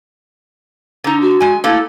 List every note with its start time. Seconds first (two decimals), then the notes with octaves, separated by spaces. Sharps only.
1.04 D3 D#4 A#5
1.21 F#4
1.40 G#3 G#5
1.64 A3 A#3 E4 A4